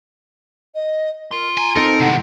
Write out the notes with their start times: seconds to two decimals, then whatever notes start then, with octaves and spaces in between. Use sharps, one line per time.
0.74 D#5
1.31 F4 A#4 C6
1.58 G#5 A#5
1.76 C4 D#4 A4 A#4 C5
2.00 A2 C3 D#3 G#3 F#5